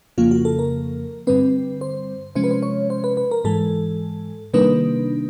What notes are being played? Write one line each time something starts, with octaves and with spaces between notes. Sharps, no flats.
F2 C#3 F3 A#3 F4
F#4
A4
A#4
G2 D3 G3 C4 B4
C5
C3 F3 G#3 C#4 C5
B4
C5
C#5
C5
B4
B4
A#4
G#2 E3 G#3 A4
C3 D#3 G3 A#3 D4 B4